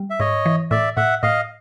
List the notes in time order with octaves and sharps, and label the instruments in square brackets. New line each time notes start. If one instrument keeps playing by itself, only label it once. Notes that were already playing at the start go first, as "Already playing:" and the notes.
Already playing: [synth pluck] G3
[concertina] E5
[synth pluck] G#2 [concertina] C#5 D#5
[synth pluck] E3
[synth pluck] A2 [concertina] D5 E5
[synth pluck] A2 [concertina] E5 F#5
[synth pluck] A2 [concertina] D#5 F5